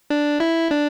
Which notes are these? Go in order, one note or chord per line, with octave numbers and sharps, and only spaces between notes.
D4
E4
D4